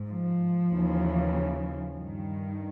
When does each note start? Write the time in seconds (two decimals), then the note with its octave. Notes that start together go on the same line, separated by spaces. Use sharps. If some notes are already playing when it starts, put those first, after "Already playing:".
Already playing: G#2
0.08 F3
0.71 D#2 C#3 E3
1.98 G2 D#3